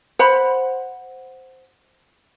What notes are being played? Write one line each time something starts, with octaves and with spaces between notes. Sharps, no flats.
C5 F#5 B5